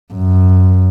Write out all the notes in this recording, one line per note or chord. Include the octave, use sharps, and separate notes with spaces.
F#2